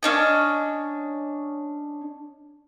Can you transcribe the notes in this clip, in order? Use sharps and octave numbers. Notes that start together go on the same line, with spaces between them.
C#4 D4 D#5